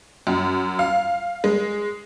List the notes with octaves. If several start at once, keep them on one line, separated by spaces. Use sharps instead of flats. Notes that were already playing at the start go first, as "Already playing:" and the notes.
F#2
F5
G#3